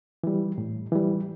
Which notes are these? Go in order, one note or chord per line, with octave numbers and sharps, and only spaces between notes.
E3 G3
A2
E3 G3